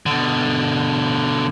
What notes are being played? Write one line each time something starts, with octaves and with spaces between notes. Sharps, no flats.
B2 D3